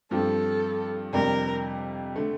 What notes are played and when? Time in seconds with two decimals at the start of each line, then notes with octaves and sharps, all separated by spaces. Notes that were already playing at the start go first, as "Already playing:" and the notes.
0.11 G2 F3 C4 G4 A4
1.13 F2 C3 G3 D4 G4 A#4
2.16 D3 A3